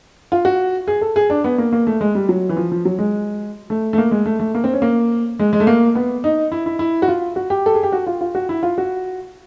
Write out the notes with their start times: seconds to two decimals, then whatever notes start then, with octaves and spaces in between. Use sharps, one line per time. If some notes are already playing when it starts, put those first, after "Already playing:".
0.32 F4
0.45 F#4
0.87 G#4
1.01 A4
1.16 G#4
1.30 D4
1.44 B3
1.58 A#3
1.72 A#3
1.87 A3
2.01 G#3
2.15 G3
2.29 F#3
2.49 E3
2.56 F3
2.72 F3
2.85 F#3
2.99 G#3
3.70 A3
3.93 A3
3.98 A#3
4.11 G#3
4.26 A3
4.40 A3
4.55 A#3
4.64 C4
4.73 C#4
4.82 A#3
5.39 G#3
5.53 G#3
5.60 A3
5.67 A#3
5.95 B3
6.24 D#4
6.52 E4
6.66 E4
6.79 E4
7.02 F#4
7.08 F4
7.36 F#4
7.50 G4
7.66 A4
7.74 G#4
7.83 G4
7.92 F#4
8.07 F4
8.21 F4
8.35 F#4
8.49 E4
8.63 F4
8.78 F#4